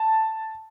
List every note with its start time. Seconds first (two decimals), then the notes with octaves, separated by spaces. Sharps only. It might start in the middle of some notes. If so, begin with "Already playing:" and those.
Already playing: A5